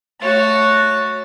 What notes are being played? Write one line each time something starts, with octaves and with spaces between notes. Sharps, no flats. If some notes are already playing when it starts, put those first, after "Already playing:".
A3 F#4 C#5 A6